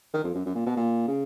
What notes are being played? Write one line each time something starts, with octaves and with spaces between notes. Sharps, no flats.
D#3
F2
F#2
F#2
A#2
B2
A#2
C#3